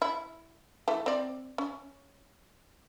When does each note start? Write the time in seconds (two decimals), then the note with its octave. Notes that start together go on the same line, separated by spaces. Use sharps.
0.02 E4
0.88 E3 A3
1.06 C4 D5
1.58 C#4